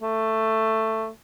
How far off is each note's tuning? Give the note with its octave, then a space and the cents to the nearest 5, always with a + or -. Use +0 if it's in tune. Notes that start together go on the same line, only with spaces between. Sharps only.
A3 +10